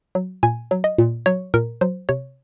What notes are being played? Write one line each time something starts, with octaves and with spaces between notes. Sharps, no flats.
F#3
A#2 G#5
F#3
D#5
A#2
F#3 C#5
A#2 A#4
F#3 C5
C3 C#5